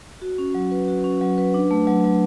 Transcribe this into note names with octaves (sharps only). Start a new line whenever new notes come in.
F#4
C#4
F#3
B4
F#4
C#4
F#3
B4
D4
A3
F#3
F#3